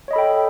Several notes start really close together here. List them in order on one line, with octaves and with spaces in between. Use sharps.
C#5 D#5 B5 A4 G5